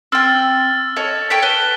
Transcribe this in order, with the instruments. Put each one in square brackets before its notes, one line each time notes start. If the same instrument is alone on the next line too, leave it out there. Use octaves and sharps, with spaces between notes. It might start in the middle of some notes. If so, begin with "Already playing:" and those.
[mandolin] C4 G5 [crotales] E6 F6 A6
[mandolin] A4 C#5 D#5
[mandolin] A4 C#5 G5 [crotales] B6
[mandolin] B4 A5 [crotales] G7